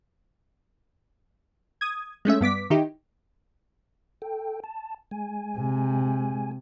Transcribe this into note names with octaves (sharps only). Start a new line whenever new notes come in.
D#6 G#6
G#3 A3 C#4 E5
G2 B3 D6 B6
D#3 D#4 E4 G4
A4 G5
A5
G#3 G#5
C3